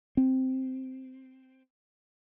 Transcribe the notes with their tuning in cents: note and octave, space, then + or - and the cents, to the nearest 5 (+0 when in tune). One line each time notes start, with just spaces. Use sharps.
C4 -5